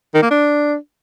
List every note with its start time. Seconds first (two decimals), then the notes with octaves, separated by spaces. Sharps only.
0.14 D#3
0.22 A#3
0.31 D4